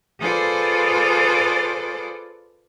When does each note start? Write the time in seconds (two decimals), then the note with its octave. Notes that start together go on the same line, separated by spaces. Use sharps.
0.19 F4 G#4 A4 B4 C5 D5